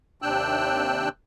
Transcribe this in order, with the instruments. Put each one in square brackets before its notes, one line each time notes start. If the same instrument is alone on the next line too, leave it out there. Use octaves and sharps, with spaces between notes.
[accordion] D#2 C3 D4 G5 E6 F#6